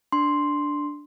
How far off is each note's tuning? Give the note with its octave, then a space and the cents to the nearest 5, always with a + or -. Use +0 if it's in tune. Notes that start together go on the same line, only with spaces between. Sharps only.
D4 +0 C6 +0